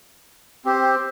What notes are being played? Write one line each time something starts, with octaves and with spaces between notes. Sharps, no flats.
C4 G4 C5